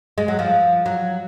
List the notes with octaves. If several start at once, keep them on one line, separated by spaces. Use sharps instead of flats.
G#3
F#3
F3
F#3